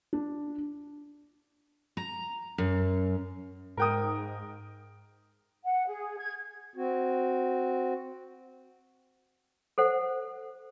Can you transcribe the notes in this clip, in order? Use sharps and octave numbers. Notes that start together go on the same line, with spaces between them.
D4
A#5
F#2
G#2 A#4 G5 D#6
F#5
G#4
G#6
C4 F#4
A4 C5 F#5